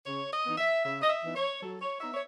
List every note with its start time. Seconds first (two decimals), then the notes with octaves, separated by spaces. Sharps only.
0.06 C#3 C#5
0.32 D#5
0.45 E3 B3 D#4
0.57 E5
0.83 C#3 E5
1.02 D#5
1.09 E5
1.22 E3 B3 D#4
1.35 C#5
1.61 F#3 A4
1.81 C#5
2.00 B3 D#4 E5
2.11 C#5